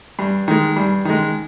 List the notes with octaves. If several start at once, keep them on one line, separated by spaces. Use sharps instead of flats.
G2
D#3 G#3
G2
D#3 G#3